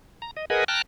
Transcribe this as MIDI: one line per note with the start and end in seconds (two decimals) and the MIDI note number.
0.22 0.31 82
0.37 0.45 75
0.50 0.64 68
0.50 0.64 70
0.50 0.64 71
0.50 0.64 75
0.50 0.64 78
0.50 0.64 80
0.68 0.82 79
0.68 0.82 81
0.68 0.82 82
0.68 0.82 89
0.68 0.82 90